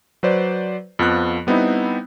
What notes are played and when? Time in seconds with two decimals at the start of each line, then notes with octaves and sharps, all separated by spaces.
0.23 F#3 B4 C5 D5
0.99 F2 F3 B3 F#6
1.47 G3 B3 C4 D#4 E4